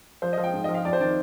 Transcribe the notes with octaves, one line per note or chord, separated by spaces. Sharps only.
F3 C5
D#5
F3
G5
G#2
D#5
F3
F5
F2 D5
C5
D#3 D5